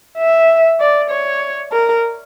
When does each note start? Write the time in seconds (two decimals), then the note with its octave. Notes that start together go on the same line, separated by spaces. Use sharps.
0.18 E5
0.80 D5
1.10 C#5
1.72 A#4